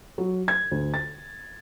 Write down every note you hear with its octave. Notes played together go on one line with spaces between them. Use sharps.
F#3
G#6
D2
A6